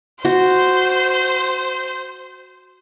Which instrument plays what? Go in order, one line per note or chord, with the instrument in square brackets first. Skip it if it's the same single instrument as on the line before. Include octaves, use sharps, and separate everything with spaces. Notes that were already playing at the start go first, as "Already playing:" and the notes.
[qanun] F#4 [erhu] C5